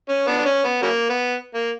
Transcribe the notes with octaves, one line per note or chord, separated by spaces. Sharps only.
C#4
B3 D4
D4
C#4
B3
C#3 F#3 A#3
B3
A#3